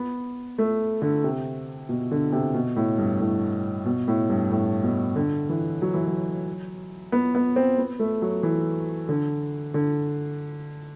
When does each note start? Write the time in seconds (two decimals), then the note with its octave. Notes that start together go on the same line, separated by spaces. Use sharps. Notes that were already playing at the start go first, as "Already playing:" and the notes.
Already playing: B3
0.58 A3
1.02 D3
1.24 C3
1.89 B2
2.11 D3
2.32 C3
2.54 B2
2.76 A2
2.98 G2
3.20 A2
3.85 B2
4.08 A2
4.30 G2
4.51 A2
4.83 B2
5.16 D3
5.49 E3
5.82 F#3
5.94 E3
6.07 F#3
7.12 B3
7.35 B3
7.56 C4
7.78 B3
7.99 A3
8.22 F#3
8.43 E3
9.09 D3
9.74 D3